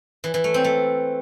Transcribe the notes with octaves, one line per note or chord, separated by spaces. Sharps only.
E3
E3
A3
C4
A3